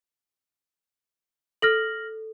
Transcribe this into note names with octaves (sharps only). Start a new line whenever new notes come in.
A4 F6 A#6 F#7